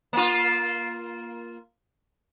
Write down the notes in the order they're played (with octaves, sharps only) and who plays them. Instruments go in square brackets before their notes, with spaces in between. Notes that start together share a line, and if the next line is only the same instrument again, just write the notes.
[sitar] A#3 F4